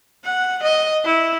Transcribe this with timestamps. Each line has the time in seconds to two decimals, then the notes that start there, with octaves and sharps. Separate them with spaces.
0.24 F#5
0.63 D#5
1.05 E4